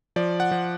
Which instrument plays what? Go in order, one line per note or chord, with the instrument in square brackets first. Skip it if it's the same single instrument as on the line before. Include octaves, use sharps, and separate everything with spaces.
[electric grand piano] F3 D5
F#5
F3